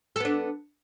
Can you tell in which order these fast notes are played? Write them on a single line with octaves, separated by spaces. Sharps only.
A4 B3 D4